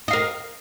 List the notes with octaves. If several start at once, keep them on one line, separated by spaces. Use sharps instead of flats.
A#4 D#5 F5